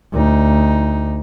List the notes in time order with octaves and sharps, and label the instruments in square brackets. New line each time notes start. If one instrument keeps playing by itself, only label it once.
[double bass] D2 D#4